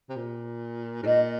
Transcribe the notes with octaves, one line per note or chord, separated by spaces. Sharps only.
C3
A#2
G#2
A#2 D#5